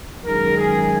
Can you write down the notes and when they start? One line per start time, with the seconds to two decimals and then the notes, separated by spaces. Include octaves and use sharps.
0.24 F#2 D#3 G#3 A#4
0.57 G#4